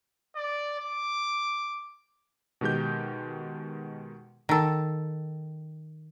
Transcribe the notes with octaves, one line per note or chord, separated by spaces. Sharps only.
D5
D6
B2 D#3 G#3 G4 G6
D#3 A4